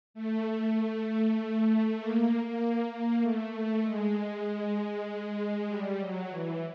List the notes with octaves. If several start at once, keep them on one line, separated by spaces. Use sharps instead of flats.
A3
A#3
A#3
A#3
A3
A3
G#3
G3
F#3
E3